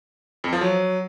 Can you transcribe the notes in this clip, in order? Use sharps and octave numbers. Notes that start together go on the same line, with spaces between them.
F2
F3
F#3